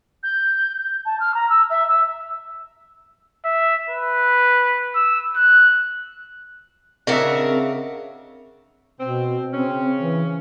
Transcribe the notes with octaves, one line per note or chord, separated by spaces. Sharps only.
G6
A5
F6
A#5
E6
E5
E6
E5
B4
E6
F#6
C#3 C4 D4 F#4 A#4 D#5 E5
B2 C4
C#3 C4 C#4
E3